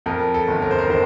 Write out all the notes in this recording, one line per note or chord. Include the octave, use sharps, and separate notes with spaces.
F2 A#4
A4
G1
A#4
C5
A#4
D#3 C5